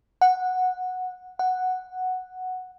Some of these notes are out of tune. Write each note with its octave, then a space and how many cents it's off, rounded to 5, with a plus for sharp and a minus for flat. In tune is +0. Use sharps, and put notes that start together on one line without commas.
F#5 -10
F#5 +0